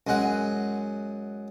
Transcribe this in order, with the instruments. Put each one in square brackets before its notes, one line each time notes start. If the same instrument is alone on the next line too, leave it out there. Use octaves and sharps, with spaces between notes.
[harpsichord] F#2 G#3 F#5